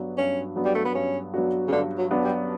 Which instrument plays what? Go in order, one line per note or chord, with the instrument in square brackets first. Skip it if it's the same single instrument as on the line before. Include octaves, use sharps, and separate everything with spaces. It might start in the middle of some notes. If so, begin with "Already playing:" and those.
Already playing: [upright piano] G2 F#3 B3 D4 F#4
[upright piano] G2 [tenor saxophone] C#4
[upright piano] F#3 B3 D4 F#4
[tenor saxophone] G3
A3
B3
[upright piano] G2 [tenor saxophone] C#4
[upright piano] F#3 B3 D4 F#4
[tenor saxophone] C#3
[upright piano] G2 [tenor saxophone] D3
[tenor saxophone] F#3
[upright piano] F#3 B3 D4 F#4
[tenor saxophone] G3